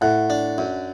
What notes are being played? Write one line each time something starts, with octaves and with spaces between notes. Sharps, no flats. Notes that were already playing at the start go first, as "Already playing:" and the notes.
A2 F#5 F#6
D4
F#2